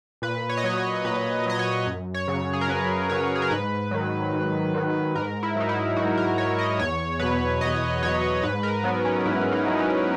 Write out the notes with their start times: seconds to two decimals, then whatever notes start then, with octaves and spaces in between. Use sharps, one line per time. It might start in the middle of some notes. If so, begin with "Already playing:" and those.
0.22 A#2 B4
0.49 C#5
0.57 D#5
0.64 F#3 C#5
0.78 C#5
1.04 A#2 B4
1.46 F#3 D#5
1.59 C#5
1.87 F#2
2.14 C#5
2.28 C#3 F#3
2.53 G#4
2.61 A#4
2.68 F#2 B4
3.10 C#3 F#3 C#5
3.35 G#4
3.42 A#4
3.51 G#2 B4
3.91 D#3 F#3
4.33 G#2
4.74 D#3 F#3
5.15 G#2 A#4
5.43 E4
5.56 F#3 D#4
5.69 E4
5.96 G#2 F#4
6.18 A#4
6.38 F#3 C#5
6.59 D#5
6.79 E2 C#5
7.19 B2 F#3 B4
7.61 E2 D#5
8.03 B2 F#3 C#5
8.43 G#2 B4
8.63 A#4
8.84 F#3 B3
9.05 C#4
9.25 G#2 E4
9.52 D#4
9.67 F#3
9.80 C#4